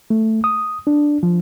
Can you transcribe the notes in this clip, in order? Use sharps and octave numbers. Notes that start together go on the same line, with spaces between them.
A3
D#6
D4
F3